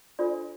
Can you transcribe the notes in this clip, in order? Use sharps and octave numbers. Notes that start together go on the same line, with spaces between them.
D4 F4 A4 C5 D5